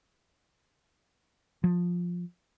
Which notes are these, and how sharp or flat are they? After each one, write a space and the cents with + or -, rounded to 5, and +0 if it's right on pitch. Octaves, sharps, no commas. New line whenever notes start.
F3 +10